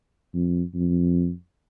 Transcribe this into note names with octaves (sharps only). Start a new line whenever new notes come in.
F2
F2